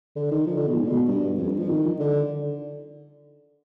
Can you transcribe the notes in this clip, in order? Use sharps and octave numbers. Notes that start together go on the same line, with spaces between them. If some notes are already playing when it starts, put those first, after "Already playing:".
D3
D#3
F3
D3
B2
G#2
B2
G2
F2
G2
F3
D#3
D3